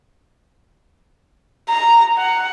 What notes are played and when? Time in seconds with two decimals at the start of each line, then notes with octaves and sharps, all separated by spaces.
1.69 A#5
2.18 F#5